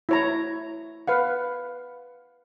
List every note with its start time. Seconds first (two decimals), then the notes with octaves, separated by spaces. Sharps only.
0.09 E4 C#5 A#5
1.07 B4 F5 F#5